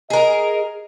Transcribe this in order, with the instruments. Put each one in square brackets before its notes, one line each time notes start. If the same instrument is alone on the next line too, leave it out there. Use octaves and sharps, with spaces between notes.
[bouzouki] G#4 A#4 [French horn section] D#5